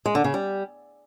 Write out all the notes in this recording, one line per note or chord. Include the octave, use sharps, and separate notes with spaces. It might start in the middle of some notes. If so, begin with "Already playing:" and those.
G#3
D3
C#3
G3